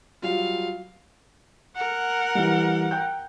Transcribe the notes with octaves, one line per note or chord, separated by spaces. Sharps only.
F#3 G3 F4 F5
A#4 F#5
E3 G3
G5 F#6 G6